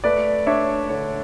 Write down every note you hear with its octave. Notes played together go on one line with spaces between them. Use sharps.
A3 B4 D5
D4 C#5 E5
D3 C#5